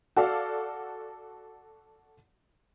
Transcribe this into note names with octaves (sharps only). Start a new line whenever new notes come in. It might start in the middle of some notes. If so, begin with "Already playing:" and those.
F#4 A4 D5 F5